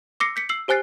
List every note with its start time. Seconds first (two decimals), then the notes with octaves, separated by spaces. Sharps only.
0.20 D6 E6 A#6 C7 C#7
0.36 G6 B6 C#7
0.49 E6 C7 F#7
0.68 G4 C5 G#5 F#6 A6 C7